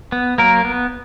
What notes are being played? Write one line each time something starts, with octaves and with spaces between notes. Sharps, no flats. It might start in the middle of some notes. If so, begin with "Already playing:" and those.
B3
F#3 A#3 A#4
B3